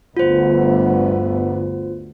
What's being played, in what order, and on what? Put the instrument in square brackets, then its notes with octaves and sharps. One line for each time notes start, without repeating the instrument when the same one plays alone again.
[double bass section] G1 D2 B3 [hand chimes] F4 C5